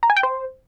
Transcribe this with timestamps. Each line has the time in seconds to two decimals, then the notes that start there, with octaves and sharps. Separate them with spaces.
0.03 A#5
0.10 G#5
0.16 G5
0.23 C5